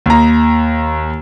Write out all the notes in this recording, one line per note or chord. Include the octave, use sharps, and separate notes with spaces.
D#2 A#5